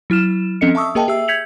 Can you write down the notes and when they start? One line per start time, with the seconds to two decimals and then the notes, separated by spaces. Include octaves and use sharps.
0.10 F#3 E4 F6 E7
0.61 F3 C4 C#4 A4 D#5 C#7
0.75 E5 A5 C#6 D#6 E6
0.95 A#3 G#4 A#4 D#5 G5 A5
1.08 G4 G#4 E5 E6
1.28 G6 G#6 B6 C#7 F7 F#7